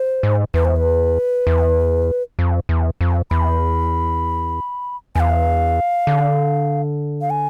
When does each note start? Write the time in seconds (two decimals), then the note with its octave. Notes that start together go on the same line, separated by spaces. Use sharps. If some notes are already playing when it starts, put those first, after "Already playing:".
Already playing: C5
0.23 G#2
0.54 E2 B4
0.65 C5
0.76 B4
1.47 E2
2.39 F2
2.69 E2
3.01 F2
3.31 E2 B5
5.15 E2 F5 G#5
6.07 D3
7.21 F5
7.30 G#5